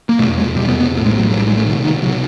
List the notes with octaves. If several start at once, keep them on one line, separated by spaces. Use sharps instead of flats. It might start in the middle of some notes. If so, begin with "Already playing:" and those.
A#3
F1 E2 B2 A3
G#3
F1 E2 B2 G3
B3
B3
A#1 A2
G#3
F#3
A#1 A2 F#3
G3
G#3
A3
C2 B2 D#3
D#3
C2 B2 F#3